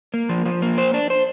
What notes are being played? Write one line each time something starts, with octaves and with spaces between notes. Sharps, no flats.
A#3
F3
F3
A#3
C5
D4
C5